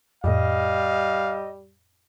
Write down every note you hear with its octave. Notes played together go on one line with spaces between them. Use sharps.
F2 A2 G3 D#5 F5